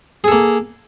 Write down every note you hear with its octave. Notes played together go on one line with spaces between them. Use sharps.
A#3 G#4 A4